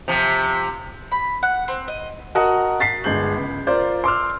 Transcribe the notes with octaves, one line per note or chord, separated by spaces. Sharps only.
C3 F3
B5
F#5
C4
D#5
F#4 A#4 D#5 F#5 A5 D#6
A6 B6 C7
G1 G#3 G6 F#7
C#2
F4 A#4 C5 D5
C6 D6 E6 F6